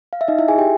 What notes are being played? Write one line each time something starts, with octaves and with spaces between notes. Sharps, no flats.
F5
E5
D#4 D#5
E4 E5
G#4 G#5
G4 G5